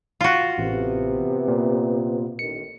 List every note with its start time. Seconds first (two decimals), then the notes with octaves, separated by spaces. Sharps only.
0.21 F4 F#4
0.58 A1 C3 B3
1.48 A#2
2.39 A1 D#3 C#7